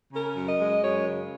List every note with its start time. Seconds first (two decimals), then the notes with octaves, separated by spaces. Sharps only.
0.13 C#3 A#4
0.36 F#2
0.48 D#5
0.59 G#3
0.82 F#2 C#5
1.05 C#3